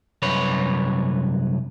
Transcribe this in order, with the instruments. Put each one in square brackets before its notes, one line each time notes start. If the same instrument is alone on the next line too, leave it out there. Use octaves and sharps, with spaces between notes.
[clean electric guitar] C2 F#2 B4 C#5